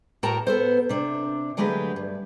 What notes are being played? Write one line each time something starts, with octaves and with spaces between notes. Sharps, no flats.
A2 F#4 A#4 G5 A5 A#5
B3 A4 C5
C3 D4
D3 F#3 G#3 A3 G4 B4
G2